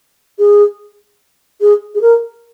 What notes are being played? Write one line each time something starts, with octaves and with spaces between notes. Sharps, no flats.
G#4
G#4
G#4
A#4